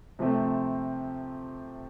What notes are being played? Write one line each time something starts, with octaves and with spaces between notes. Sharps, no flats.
C3 F3 A3 C4